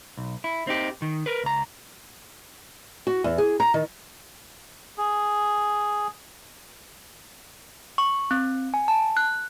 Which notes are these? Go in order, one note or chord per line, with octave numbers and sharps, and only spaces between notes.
B1
E4
C4 D#4 G4
D#3
A#4 B4
C#2 A#5
F#4
E2
G#4
A#5
D#3
G#4
C#6
C4
G#5
A5
F#6